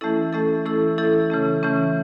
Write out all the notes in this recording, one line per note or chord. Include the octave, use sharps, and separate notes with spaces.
E3 A3 C#4 E4 A4
E3 A3 C#4 E4 A4
E3 A3 C#4 E4 A4
E3 A3 C#4 E4 A4
C#3 E3 A3 C#4
C#3 E3 A3 C#4